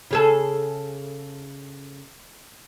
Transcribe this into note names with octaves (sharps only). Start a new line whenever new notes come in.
C#3 G#4 A4